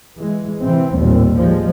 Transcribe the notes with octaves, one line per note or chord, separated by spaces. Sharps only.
E3 G#3
C3 E3 C4
A1 D#2 A#2 G3 C4
F3 G3 G#3